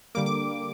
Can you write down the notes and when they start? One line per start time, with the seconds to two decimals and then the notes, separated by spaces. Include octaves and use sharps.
0.15 D3 G3 A#3 D6
0.26 D6